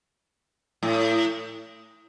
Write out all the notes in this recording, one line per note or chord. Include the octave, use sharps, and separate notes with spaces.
A2